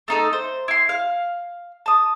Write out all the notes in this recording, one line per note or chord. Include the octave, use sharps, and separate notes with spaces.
A3 D#4 A4
C5
E4 C6
F5
A5 D#6